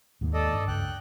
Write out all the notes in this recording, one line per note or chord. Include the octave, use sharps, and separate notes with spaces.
D#2 G#2 D#3 A#3
A4 D5 D#5
G2
C#2 G5 F#6